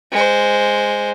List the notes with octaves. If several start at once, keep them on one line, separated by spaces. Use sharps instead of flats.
G#3 C5